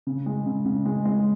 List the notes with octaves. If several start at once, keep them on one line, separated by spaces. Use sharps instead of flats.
C#3
G#3
C#3
C#3
G#3
G#3